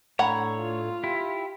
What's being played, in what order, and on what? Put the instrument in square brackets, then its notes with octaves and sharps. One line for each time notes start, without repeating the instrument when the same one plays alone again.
[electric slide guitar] A2 A3 D4 [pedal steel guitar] C#5 [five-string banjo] F#5 A#5 B5
[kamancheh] F4
[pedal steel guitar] E4 [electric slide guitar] G4